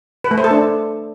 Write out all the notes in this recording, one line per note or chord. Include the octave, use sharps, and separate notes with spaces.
B4
A3
C5
A4
D4